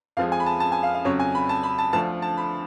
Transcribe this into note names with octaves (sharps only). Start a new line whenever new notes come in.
F2 F3 G#3 F5
G#5
B5
A5
A5
G#5
F5
F5
F2 C#3 F#3 C#5
G#5
B5
A5
B5
A5
D2 D3 F3 A5
A5
B5